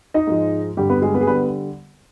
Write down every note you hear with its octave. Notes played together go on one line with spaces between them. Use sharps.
D#4 D#5
G#2 F3 G#3
G2 D3 G3 G4
B3 B4
G#3 G#4
B3 B4
G#4
D3 G3 B3 B4